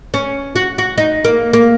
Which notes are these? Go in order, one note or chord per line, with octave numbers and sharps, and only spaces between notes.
C#4
F#4
F#4
D#4
A#3
A#3